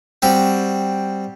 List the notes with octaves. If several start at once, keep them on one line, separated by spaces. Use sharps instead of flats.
G3 C4 F#4